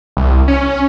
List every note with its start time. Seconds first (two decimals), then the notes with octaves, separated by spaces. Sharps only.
0.17 C2
0.48 C#4